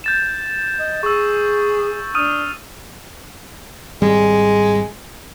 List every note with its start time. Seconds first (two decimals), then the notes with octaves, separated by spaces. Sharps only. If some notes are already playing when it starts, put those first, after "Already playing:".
0.04 G6 A6 E7
0.79 D#5
1.03 G#4 C#6 E6
2.15 D4 D#6 F6 D#7
4.02 G#1 G3 G#3